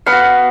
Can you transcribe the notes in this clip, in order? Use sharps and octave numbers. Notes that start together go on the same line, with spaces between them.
B3 F5
F#4